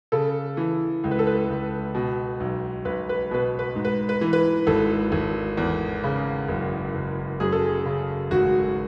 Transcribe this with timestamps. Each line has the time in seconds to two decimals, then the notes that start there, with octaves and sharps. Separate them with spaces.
0.12 C#3 A4
0.57 E3
1.04 C#2
1.11 B4
1.19 A4
1.27 B4
1.49 C#2
1.95 B2
2.40 B1
2.85 B1 B4
3.09 B4
3.31 B2 B4
3.59 B4
3.75 G#2
3.85 B4
4.09 B4
4.21 E3
4.33 B4
4.67 G#1 A4
5.12 G#1
5.57 E2
6.03 C#3
6.48 F#1
6.94 F#1
7.40 F#2 G#4
7.52 A4
7.66 G#4
7.85 C#3
8.31 G#1 F#4